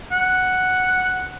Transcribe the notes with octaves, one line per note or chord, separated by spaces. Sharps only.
F#5